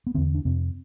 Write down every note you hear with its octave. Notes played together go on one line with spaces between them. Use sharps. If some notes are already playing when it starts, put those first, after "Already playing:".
B3
E2 D3 C4
D4
F2 C3 C4